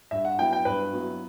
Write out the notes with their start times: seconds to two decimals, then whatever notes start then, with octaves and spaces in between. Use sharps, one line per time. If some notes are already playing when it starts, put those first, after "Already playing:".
0.11 G2 E5
0.25 F#5
0.38 F#3 B3 E4 G5
0.53 G5
0.65 G2 B4
0.93 F#3 B3 E4